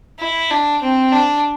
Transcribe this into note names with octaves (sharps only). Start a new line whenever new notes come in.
E4
D4
C4
D4